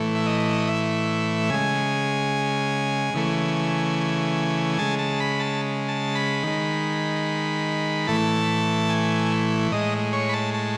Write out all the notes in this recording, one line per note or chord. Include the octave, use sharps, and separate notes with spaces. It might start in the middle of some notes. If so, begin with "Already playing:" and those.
Already playing: A2 E3 A3
E5
D#5
E5
C#3 G#3 G#5
C#3 E3 A3
C#3 G#3 A5
A5
B5
A5
A5
B5
D#3 G#3
A2 E3 A3 A5
G#5
A2 G#3 D#5
C#5
B5
A5
A5